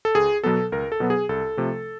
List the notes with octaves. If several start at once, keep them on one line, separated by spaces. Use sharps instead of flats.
A4
C#2 G#4
B2 F#3 B3 A4
C#2 A#4
A4
B2 F#3 B3
G#4
C2 A4
C3 F3 A3